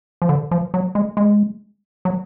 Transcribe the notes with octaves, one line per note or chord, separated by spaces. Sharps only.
F3
D3
F3
F#3
G#3
G#3
F#3